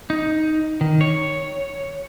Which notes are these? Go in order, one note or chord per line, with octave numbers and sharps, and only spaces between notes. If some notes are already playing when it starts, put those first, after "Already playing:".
D#4
D#3
C#5